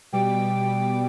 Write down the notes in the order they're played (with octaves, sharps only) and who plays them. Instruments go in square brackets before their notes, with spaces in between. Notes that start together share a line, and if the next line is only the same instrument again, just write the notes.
[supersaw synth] B2 G3 D6 [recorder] G5